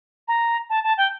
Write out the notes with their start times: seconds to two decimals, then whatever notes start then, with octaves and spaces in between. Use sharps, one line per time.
0.28 A#5
0.70 A5
0.84 A5
0.98 G5